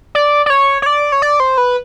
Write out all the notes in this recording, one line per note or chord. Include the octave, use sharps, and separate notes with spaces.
D5
D5
C#5
C#5
D5
C#5
D5
C5
B4